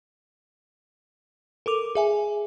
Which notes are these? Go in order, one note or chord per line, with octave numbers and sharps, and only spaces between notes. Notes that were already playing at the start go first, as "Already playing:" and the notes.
A4 A#4 D6 F7
G#4 E5 G#5